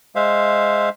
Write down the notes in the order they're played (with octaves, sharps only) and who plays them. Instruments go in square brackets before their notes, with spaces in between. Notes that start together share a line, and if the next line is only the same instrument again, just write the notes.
[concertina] G#3 C5 E5 F5